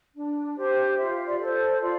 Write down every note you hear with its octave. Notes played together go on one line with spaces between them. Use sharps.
D4
G4 C5
F4 E5
D5
A4 C5
F4 D5